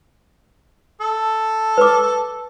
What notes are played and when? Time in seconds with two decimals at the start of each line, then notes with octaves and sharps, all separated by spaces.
1.01 A4
1.77 B4 D6